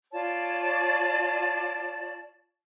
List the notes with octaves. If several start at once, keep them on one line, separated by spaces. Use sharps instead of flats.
F4 C#5 D5 A5